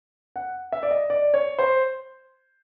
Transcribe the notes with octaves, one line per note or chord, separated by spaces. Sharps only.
F#5
E5
D5
D#5
D5
C#5
C5